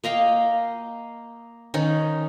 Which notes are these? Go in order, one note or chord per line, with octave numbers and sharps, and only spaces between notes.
A#3 D#5 F5 G5
D#3 C#4 D#4